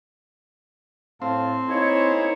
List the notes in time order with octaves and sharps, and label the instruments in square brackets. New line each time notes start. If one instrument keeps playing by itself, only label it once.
[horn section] A2 F5 A5 [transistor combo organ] C4
[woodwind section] A#3 E4 C#5 [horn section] D#4 G#4 C5